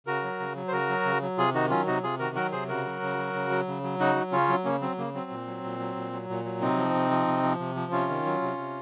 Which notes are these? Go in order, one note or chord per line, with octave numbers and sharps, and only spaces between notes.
C#3 F#4 A#4
F#3
C#3
F#3
C5
C#3 F#4 A#4
F#3
C#3
F#3
C3 F4 G#4
D#3 D#4 F#4
F#3 C#4 F4
C3 D#4 F#4
C3 F4 G#4
D#3 F#4 A#4
F#3 F#4 A#4
C3 G#4 C5
C#3 F#4 A#4
F#3
C#3
F#3
C#3
F#3
C#3
F#3
C#3 D#4 F#4
F#3
C#3 C#4 F4
F#3
C#3 A#3 C#4
F#3 C4
C#3 A#3
F#3 C4
A#2
F#3
A#2
F#3
A#2
F#3
A#2
F#3
C3 C4 D#4
F3
C3
F3
C3
F3
C3
F3
C3 C#4 F4
D#3
F#3
C3
C3